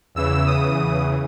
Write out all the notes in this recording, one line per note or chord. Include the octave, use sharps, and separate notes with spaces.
E2 C#3 E3 E6
D#6